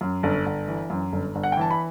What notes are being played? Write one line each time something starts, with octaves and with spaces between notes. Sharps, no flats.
F#2
G1
G1
E3
F#2
G1
G1
F#5
G5
E3 A5
B5